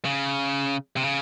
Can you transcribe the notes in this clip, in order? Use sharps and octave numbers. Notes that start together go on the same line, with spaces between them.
C#3
C3
C#3